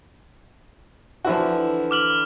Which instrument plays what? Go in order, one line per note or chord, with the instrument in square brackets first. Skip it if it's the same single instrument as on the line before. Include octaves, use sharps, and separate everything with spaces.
[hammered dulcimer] D3 E3 A#4 [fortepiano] F3 E4 F#4
[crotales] D6 F6 F#7